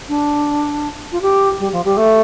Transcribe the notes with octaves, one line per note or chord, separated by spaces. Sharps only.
D4
F4
G4
G3
F3
G3
A3